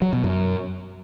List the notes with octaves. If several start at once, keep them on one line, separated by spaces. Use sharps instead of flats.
F#3
B2
F#2